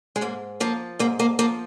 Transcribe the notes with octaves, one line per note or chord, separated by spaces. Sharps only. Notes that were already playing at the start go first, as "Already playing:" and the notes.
G#3
G#2 A#3
F3 A#3
G#2 A#3
A#3
F3 A#3